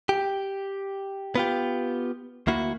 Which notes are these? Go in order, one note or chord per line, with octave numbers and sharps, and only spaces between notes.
G4
B3 F4 G4
D2 A#3 E4 F#4